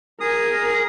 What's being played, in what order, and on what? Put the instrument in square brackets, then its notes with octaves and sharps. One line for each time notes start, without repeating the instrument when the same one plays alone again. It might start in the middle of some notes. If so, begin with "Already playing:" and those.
[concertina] G#4 D#6 [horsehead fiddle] A#4